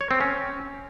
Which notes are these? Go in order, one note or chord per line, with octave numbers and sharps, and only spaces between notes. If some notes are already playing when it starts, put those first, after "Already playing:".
C#5
C4
C#4